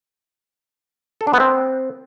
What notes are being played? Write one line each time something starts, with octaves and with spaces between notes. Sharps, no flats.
A4
D4
B3
C4